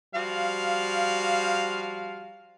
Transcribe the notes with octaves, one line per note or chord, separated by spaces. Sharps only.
F3 G3 F#4 F5